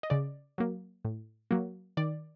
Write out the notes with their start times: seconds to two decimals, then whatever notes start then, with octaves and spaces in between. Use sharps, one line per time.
0.03 D#5
0.10 C#3 D5
0.58 F#3 A#3
1.05 A2
1.51 F#3 A#3
1.97 D#3 D5